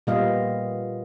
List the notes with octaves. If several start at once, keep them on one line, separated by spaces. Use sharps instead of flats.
A#2 G3 B3 D#5 F5